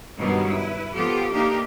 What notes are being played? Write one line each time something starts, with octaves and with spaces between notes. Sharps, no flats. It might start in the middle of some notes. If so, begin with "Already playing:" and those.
G2 B2 D#3 F#3 G3 B3
E4 B4
F3 B3 F4 G4 A4
A3 A#3 D4 D#4 G4 A#4